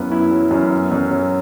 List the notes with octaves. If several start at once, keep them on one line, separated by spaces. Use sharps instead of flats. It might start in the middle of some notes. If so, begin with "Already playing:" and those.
Already playing: F#2 F#3 B3 E4
E4
F#3
F#2
B3
F#2
F#3